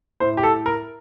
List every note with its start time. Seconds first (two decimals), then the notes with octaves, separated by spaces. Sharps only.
0.20 A2 C5
0.37 G4
0.43 A4
0.66 A#4